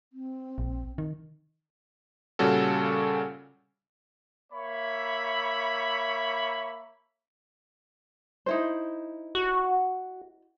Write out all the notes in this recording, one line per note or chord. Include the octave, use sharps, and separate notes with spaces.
C4
A#1
D#3
A#2 C#3 G3 C#4 F#4 A4
A#3 C#5 E5 B5
D#4 E4 C5
F#4